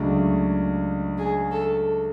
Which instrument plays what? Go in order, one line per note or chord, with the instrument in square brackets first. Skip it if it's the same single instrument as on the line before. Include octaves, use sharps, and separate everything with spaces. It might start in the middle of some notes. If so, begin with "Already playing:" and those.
Already playing: [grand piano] C#2 C#3 F#3 A3 D4
[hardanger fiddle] G#4
A4